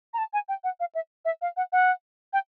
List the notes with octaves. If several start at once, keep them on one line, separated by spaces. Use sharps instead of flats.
A#5
A5
G#5
G5
F#5
F5
E5
E5
F5
F#5
F#5
G5